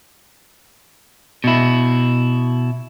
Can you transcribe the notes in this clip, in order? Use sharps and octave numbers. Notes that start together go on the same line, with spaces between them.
B2 E4